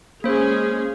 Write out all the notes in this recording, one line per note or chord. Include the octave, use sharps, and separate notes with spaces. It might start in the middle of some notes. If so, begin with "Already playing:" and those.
G#3 A#3 C#4 G#4 C5